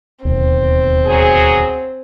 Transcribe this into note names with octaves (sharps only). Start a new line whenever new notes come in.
D1 D#2 B2 C4
F#3 G#4